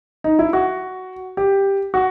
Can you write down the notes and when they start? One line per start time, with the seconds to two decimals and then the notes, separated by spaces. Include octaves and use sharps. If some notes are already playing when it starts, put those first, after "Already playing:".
0.24 D#4
0.39 E4
0.53 F#4
1.37 G4
1.94 F#4